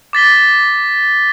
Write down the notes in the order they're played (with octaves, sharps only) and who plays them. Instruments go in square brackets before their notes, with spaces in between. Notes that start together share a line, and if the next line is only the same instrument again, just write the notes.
[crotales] D6 A6 B6 G7